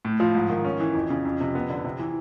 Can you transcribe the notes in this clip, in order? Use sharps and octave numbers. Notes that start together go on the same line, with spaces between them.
A2
F3
G#2
D#3
C#4
E3
F2
C#3
F2
C3
B3
D3
C3
E3